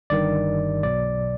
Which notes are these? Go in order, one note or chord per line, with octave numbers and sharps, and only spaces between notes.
G1 G2 D#3 D5
B1 B2 F#3 D5